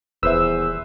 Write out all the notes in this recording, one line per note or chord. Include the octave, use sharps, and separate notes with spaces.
D#1 E2 B4 C5 E5 E6